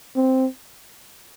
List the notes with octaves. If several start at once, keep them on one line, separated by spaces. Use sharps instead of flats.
C4